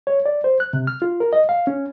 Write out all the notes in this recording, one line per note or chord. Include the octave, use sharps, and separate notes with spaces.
C#5
D5
C5
F#6
C3
F6
F4
A#4
D#5
F5
C#4